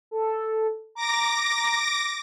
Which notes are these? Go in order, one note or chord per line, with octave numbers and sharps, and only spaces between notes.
A4
A#5 D6 A#6